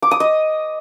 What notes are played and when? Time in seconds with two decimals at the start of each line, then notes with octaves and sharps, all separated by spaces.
0.02 D6
0.11 D#6
0.20 D#5